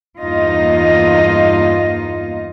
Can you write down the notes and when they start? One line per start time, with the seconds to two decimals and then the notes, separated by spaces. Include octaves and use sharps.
0.18 E2 G2 A#3 D#4 F4 D#5